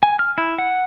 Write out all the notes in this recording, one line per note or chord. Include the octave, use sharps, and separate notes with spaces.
G#5
F6
E4
F#5